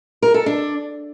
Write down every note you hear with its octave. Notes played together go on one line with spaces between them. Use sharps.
A#4
A4
D4